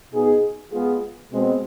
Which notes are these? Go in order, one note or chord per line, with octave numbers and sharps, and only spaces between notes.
B2 B3 D#4 G#4
G#3 B3 F4 G#4
B2 G#3 C4